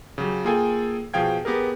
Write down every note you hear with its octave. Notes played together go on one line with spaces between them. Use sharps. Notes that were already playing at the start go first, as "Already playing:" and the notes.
C#3 F#3 G4
A#3 F4 G#4 A4 G5 G#5
B2 F3 G#4 F5 G5 G#6
B3 G4 G#4 A#4